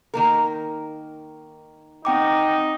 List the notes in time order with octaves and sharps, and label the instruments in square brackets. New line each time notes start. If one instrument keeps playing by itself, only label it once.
[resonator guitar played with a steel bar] D#3 A#3 A#4
[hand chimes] C4 G5 D6 [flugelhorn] D#4